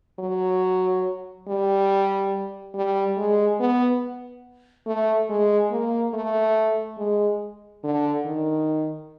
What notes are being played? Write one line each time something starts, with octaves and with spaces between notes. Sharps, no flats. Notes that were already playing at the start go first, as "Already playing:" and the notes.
F#3
G3
G3
G#3
B3
A3
G#3
A#3
A3
G#3
D3
D#3